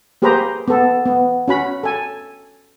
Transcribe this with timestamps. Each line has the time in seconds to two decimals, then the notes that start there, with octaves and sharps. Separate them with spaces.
0.22 A#3 G4 G#4 B4 C5 A#5
0.68 B3 A4
1.06 B3
1.48 C#4 F#4 B5
1.83 A4 G#5